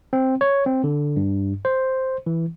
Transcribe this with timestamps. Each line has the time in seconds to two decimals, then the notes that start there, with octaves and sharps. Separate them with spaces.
0.13 C4
0.41 C#5
0.66 C4
0.84 D3
1.16 G2
1.65 C5
2.26 E3